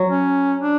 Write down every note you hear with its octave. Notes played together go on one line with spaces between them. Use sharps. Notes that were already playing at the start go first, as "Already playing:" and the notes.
Already playing: F#3
C#4
D4